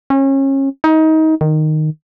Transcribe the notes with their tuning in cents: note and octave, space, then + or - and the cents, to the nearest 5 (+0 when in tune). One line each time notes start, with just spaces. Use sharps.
C#4 -30
D#4 +25
D#3 -10